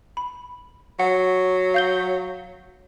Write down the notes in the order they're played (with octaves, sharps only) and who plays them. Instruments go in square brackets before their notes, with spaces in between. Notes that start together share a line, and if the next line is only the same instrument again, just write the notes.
[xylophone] B5
[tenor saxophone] F#3 [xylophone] F#5
[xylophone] F5 G6 G7